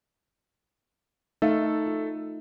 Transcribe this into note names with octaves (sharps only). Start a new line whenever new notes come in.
A3 D#4 A4 E5 F5
F4